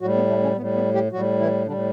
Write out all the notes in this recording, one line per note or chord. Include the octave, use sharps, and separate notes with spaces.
A2 F#3 G3 F#4
B3
A3
C#3 C#4
A2 G3 B3
B3
G3 G4
A2 F#3 G3 F#4
E3 E4
A2 D3 G3 D4